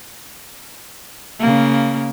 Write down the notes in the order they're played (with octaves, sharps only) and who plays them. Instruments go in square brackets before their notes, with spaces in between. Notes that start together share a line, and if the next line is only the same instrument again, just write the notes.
[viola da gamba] C#3 A#3